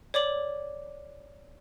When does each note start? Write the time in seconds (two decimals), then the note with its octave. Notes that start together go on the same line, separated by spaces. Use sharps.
0.14 C#5 D5 D6 F#7